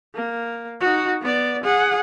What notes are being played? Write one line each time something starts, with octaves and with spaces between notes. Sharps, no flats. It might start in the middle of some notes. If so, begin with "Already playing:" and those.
A#3
D#4 F#4
B3 D5
G#4 F#5